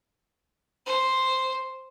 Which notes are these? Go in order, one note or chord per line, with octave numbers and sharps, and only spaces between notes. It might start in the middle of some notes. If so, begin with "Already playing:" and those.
C5